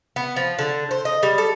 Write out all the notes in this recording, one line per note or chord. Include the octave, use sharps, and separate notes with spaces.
B3
F3
D3
C5
D#5
G3
A4